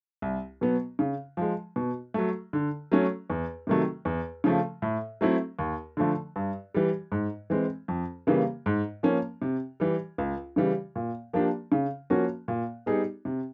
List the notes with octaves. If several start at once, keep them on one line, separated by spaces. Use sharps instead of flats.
C2
B2 F#3 B3
C#3
F3 G#3
B2
F#3 A3
D3
F#3 A3 C#4
E2
C3 D#3 F#3 A3
E2
C#3 F3 A3
A2
F#3 A3 C4 E4
D#2
D3 F3 A3
G2
E3 G3
G#2
E3 G#3 C4
F2
C#3 E3 G3 A#3
G#2
F3 A#3 C#4
C3
E3 G3
C#2
C#3 E3 G3
A#2
F3 A#3 D4 G4
C#3
F3 A#3 C#4 F#4
A#2
G3 B3 D#4 G#4
C3